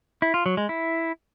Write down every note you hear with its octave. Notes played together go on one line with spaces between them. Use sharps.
E4
F4
F#3
G#3
E4